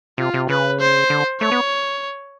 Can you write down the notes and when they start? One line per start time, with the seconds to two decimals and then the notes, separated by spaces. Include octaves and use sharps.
0.18 C3 F4
0.34 C3
0.49 C#3 B4
0.80 C5
1.10 D3
1.41 A3 C#5
1.52 B3